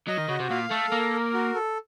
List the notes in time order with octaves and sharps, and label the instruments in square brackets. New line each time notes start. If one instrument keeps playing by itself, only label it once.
[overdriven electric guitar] F#3 [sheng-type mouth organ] D#5
[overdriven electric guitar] D#3
[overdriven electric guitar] C#3 [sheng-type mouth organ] F#4
[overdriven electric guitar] C3
[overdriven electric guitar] A#2 [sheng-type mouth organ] F5
[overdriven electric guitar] A3 [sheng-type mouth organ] A4
[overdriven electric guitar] A#3 [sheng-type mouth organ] A#4
[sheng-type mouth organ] A#4
F#4
A4